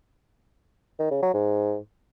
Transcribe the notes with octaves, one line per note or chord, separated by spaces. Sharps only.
D#3
C#3
F#3
G#2